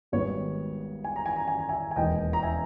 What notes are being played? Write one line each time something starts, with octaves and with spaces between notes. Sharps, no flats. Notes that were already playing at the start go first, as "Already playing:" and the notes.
G#1 G#2 G3 B3 D#4 C#5
G#5
A#5
G#5
A#5
G#5
A#5
E5 G#5
G#5
E1 D#2 D#3 D#5 G5
A#5
E5 G#5